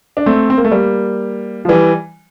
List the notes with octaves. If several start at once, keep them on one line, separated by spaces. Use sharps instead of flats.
D4
A3 C4
C4
A#3
A3
G3 A#3
F3
E3 G3